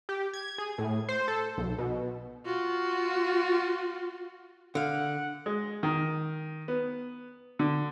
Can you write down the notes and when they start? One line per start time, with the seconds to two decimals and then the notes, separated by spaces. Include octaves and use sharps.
0.09 G4
0.33 G#6
0.58 G#4
0.78 A2
1.09 C5
1.28 A4
1.58 B1
1.78 B2
2.45 F4 F#4
4.75 D3 F5 F#5
5.46 G#3
5.83 D#3
6.68 B3
7.59 D3